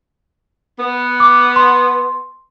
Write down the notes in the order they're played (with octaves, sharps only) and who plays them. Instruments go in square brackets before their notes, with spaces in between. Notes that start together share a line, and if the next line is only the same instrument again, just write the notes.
[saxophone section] B3
[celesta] D6
C6